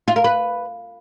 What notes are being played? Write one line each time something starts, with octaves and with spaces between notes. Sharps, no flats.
F4
A#4
B4